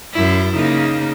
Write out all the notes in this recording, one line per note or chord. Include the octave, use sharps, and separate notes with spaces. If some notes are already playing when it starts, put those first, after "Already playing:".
F#2 E4
C#3 A#3 D#4